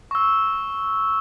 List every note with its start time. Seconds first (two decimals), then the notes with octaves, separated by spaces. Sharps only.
0.11 C#6 E6